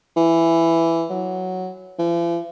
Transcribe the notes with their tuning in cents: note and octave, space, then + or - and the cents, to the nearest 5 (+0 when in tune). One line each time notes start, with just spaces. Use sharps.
E3 +10
F#3 +0
F3 -45